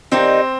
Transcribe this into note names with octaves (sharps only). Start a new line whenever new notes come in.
D#3 G3 A#3 C4 D#4